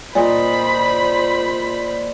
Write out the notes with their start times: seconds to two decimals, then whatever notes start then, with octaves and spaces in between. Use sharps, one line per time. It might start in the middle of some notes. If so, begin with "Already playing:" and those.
0.15 A#2 C5 D#5 A#5 B5